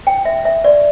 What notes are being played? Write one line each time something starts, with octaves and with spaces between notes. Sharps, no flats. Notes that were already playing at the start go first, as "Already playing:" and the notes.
G5
E5
E5
D5